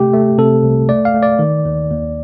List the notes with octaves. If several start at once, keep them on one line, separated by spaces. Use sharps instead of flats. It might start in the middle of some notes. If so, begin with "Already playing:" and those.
Already playing: C3 A3 G4
A3
C3 A4
C2
A3 D5
F5
A3
D5
D#3
D#2
D#2